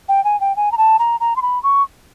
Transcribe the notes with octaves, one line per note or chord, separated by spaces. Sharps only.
G5
G#5
G5
G#5
A#5
A5
A#5
A#5
C6
B5
C#6